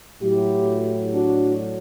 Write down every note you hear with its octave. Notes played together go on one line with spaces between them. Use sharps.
A2 F#3 E4 G4
D4 F#4